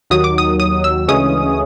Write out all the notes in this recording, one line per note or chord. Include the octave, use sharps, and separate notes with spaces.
D#2 D#3 F#3 D#6
D6
D#6
D#6
E6
D2 C#3 E3 G#3 C#4 D#6